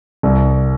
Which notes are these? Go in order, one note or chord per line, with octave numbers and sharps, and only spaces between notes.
C2